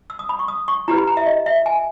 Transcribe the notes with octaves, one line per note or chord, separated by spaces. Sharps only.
E6
D#6
B5
C#6
D#6
C#6
E4 G4 B4 A#5
B5
A#5
E5
D#5
E5
G#5